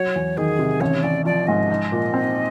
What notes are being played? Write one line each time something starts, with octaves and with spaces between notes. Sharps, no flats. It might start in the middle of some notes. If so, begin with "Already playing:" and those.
Already playing: F#3 C#5
E2
D#3 G#4
C3
A1 C#5
A1 D5
F3 D5
G#2 D#5
D#4
A#2
C4